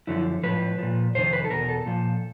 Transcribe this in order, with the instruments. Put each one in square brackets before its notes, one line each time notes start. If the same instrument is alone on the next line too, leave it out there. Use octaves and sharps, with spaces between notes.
[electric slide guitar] F#2 D3 F3 E4
A2 F3 B4
A#2 F3
F2 C3 D#3 C5
B4
A4
E2 B2 A#4
A4
A#2 F3